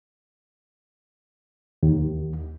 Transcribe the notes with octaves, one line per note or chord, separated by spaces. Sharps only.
D#2